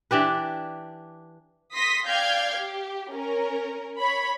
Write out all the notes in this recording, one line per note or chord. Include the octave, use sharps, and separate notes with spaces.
E3 D4 G4 B4
C6 D#6 A#6 B6
D5 F5 G5 F6 G6 G#6
G4
C#4 A#4
C#5 B5